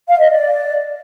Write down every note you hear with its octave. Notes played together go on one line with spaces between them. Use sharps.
F5
D#5
D5